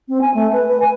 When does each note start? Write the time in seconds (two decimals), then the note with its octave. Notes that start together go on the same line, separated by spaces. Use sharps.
0.09 C4
0.21 G#5
0.34 A3
0.53 B4
0.69 B4
0.80 G#5